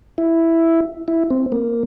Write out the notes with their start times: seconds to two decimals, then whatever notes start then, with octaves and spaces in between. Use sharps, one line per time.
0.18 E4
1.08 E4
1.30 C4
1.52 A#3